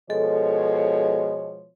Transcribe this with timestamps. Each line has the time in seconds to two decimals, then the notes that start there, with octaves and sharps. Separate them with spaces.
0.10 B2 F3 G#3 A4 C#5